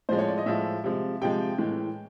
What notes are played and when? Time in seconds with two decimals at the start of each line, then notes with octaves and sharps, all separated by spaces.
0.09 A2 F3 G#3 C5
0.18 C#5
0.28 D5
0.38 D#5
0.46 A2 F3 G#3 E5
0.84 C3 F3 G#3
1.21 C3 F3 G#3 G5
1.58 A2 E3 G#3